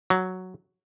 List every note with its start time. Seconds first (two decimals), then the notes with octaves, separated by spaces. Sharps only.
0.10 F#3